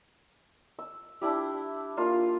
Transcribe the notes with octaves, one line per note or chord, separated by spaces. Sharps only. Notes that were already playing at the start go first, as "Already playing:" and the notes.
E6
D4 E4 G4
A#3 D4 F4 F5